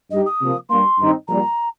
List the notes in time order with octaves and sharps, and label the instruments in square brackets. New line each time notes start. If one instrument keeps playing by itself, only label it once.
[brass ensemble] G2 G3 D#4 G4 [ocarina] D#5
[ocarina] D#6
[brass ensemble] C3 F3 A#3
[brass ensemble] G2 G3 A#3 [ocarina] C6
[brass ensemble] G2 D#3 C4 D#4
[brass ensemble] A#1 A#2 G3 [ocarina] A#5